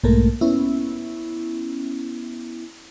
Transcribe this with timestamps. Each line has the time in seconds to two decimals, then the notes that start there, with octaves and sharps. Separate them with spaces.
0.04 B1 G#2 A3 A#3 A#4
0.41 B3 C#4 E4